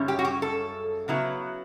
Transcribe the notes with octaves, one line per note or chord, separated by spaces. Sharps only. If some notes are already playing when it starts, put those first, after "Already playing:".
Already playing: F#2 C#3 G3 C#4 E4
G4
F#4
G4
A4
C#3 F#3 B3 E4